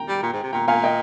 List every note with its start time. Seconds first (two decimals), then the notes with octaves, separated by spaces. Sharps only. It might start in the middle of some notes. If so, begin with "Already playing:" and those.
Already playing: G5 A#5
0.08 G3
0.23 A#2
0.33 G#2
0.43 C3
0.53 A#2 G5 A#5
0.68 A#2 F5 G#5
0.84 D#5 G5